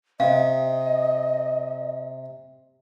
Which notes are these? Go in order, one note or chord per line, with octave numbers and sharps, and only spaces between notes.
C3 D#5 F5